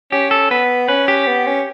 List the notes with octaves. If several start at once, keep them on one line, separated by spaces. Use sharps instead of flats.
C#4 G4
A4
B3 B4
C#4 B4
G4
B3
C#4